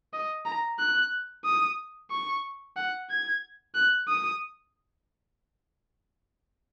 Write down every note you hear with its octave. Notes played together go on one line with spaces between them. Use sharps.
D#5
A#5
F#6
D#6
C#6
F#5
G#6
F#6
D#6